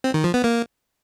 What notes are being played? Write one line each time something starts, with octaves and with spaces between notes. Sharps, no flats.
C4
D#3
F3
B3
A#3